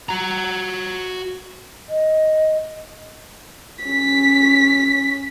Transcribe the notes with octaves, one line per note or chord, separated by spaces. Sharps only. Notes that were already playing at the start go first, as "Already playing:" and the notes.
F#4 A#5
D#5
C#4 B6